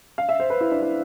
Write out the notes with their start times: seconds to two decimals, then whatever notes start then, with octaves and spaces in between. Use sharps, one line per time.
0.18 F5
0.29 E5
0.40 C5
0.50 B4
0.61 E4
0.71 D4
0.82 E4